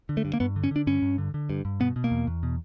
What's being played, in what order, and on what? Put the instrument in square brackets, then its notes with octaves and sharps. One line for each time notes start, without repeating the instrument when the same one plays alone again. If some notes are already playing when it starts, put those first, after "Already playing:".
[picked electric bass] D3
A3
G2
A#3
G2 B3
D3
C#4
D3 D4
G2 C#4
G2
D3
D3
G2
G2
B2 B3
B2
A#3
E2
E2
B2